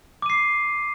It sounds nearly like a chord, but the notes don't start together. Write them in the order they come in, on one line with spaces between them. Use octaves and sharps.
D6 D#7 C7